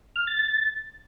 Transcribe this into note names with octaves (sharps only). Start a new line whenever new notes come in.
F6
A6
A6